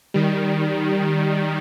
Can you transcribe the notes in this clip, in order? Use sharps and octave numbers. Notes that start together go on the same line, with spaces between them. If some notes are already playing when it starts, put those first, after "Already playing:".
D#3 G3